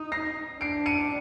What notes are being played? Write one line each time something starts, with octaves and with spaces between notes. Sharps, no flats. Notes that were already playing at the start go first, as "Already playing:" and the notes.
Already playing: D#4
A#6 C7
D4 C7 D7
C#7 D#7